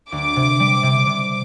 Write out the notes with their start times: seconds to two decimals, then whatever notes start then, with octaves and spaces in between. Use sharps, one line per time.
0.12 D2 D6
0.36 C3
0.60 G3
0.83 C3
1.07 C3